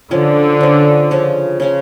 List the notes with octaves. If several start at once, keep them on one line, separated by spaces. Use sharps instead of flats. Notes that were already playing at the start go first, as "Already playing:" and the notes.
D3 F3 C#4 F4
F3 C#4 F4
C#3 F3 C#4
C#3 F3 C#4